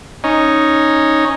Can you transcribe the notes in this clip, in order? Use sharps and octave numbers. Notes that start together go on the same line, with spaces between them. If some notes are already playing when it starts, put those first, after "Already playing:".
C#4 D#4